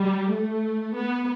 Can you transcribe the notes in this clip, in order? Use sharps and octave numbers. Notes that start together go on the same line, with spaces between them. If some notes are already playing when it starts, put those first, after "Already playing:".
Already playing: G3
A3
B3